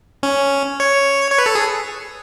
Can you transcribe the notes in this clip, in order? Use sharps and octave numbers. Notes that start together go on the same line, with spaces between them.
C#4
C#5
C#5
B4
A4
G#4